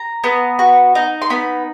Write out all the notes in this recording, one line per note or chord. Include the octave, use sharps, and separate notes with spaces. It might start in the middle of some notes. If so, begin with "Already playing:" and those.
Already playing: A#5
B3
F#4
D#4
C6
B3 B5